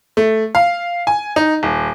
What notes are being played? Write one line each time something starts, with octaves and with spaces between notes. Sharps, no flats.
A3
F5
G#5
D#4
D#1